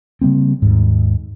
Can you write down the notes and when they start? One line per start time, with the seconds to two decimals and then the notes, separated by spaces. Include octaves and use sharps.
0.21 C#3 G3 A#3 C4
0.62 D#2 G#2